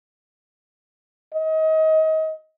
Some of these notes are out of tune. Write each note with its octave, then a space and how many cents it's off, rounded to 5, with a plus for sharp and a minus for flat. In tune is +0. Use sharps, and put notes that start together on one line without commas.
D#5 +30